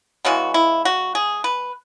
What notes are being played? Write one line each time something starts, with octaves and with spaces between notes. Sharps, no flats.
C#3 E3 G#3 B3 F#4
E4
F#4
G#4
B4